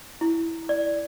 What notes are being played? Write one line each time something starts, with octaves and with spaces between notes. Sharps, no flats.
E4
D5